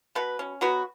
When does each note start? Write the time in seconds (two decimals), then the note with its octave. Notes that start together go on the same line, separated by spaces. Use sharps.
0.15 B2 B3 B4
0.39 C#4
0.61 F#3 B3 F#4